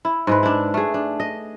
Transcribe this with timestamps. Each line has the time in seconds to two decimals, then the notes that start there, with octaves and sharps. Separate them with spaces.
0.05 E4
0.27 G#2 G#3 B4
0.43 D4 E4
0.74 A3 G#4
0.94 D4
1.20 D#5